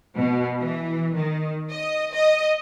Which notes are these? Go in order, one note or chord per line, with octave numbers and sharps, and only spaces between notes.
B2
E3
D#3
D#5
D#5